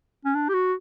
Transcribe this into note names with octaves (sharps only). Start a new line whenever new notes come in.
C#4
D4
G4
F#4